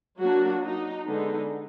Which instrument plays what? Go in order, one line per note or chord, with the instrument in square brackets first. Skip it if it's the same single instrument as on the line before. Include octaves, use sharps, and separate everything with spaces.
[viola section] F#3 A#3 D4 F#4
D#4
D3 G#3 B3 D4 D#4